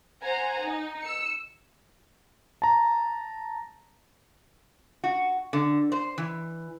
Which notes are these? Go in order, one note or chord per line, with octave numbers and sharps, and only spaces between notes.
C5 F#5 G#5 A#5
D#4
E6 C#7
A5 A#5
F#4
D3
C5
E3